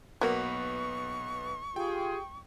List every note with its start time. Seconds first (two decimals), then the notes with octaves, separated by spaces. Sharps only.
0.21 B1 F#3 A#3 B3 B4 C#6
1.76 F4 G4 G#4 G5